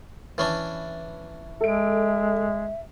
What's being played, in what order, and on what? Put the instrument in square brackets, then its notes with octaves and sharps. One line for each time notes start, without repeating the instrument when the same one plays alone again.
[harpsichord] E3 C#4 D4
[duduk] G#3 [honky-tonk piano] A4 D7 [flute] E5